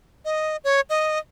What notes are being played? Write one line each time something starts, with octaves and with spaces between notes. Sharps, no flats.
D#5
C#5
D#5